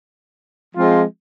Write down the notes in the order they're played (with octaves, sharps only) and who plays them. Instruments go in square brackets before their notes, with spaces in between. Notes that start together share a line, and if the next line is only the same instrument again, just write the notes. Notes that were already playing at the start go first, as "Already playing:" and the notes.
[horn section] F3 G#3 C4 F4